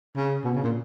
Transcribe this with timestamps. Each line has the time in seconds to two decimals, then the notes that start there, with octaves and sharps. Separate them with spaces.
0.16 C#3
0.45 B2
0.54 C#3
0.64 A#2